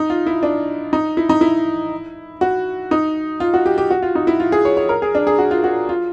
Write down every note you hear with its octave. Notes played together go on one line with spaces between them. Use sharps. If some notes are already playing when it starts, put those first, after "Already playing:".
Already playing: D#4
F4
E4
D4
D#4
E4
D#4
E4
F#4
D#4
F4
F#4
G4
G4
F#4
F4
D#4
E4
F4
G#4
C#5
C#5
A#4
G#4
D4
G#4
F#4
F4
F#4
F4